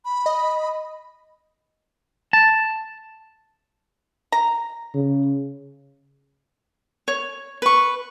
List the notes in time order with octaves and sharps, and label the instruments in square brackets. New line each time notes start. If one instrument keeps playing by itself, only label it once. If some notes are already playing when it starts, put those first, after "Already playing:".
[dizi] B5
[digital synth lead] D#5
[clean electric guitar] A5
[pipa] A#5
[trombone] C#3
[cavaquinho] C#5
B4 C#6